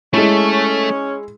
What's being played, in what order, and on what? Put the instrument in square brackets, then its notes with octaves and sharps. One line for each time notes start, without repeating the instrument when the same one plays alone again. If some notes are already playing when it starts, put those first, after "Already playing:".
[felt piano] G#3 E4 [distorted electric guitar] A3 A4 [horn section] C#4